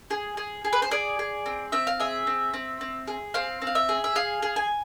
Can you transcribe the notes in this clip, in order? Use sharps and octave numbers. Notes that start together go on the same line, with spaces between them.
G#4
G#4
G#4
B4
C5
G#4 D5
G#4
C4
C4 E5
F5
G#4 E5
C4
C4
C4
G#4
C4 F5
C4
F5
E5
G#4
E5
G#4 F5
G#4
G#5